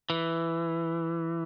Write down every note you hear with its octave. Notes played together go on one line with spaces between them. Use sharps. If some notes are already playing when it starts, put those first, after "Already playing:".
E3